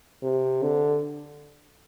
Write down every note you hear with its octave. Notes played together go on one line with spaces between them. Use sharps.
C3
D3